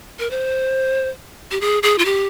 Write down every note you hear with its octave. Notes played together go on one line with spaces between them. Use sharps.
A#4
C5
G4
G#4
G#4
F4
G4